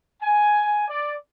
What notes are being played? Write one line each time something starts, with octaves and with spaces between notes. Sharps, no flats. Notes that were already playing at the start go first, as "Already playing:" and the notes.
G#5
D5